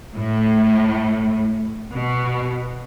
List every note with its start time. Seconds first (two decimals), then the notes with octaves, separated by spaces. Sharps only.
0.15 A2
1.92 B2